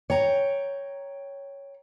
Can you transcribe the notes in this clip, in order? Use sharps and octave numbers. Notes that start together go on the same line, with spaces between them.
C#5 G5 A#5